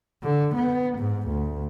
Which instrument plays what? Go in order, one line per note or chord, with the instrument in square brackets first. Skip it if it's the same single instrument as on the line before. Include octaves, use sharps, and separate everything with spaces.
[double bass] D3
B3
G#2
D2